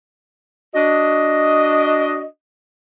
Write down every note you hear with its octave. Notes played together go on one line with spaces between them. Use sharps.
D4 F#4 D#5